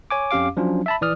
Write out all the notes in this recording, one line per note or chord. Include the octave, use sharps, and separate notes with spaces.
C#5 G#5 D6
F2 C#4 G4 F5 D6
F3 F#3 C#4 D4 F4
E5 A5 B5
A#1 E3 D5 D#6 F6